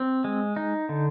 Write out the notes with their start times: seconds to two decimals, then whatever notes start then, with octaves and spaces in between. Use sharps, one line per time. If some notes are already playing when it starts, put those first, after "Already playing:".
Already playing: C4
0.24 G#3
0.56 D#4
0.89 D3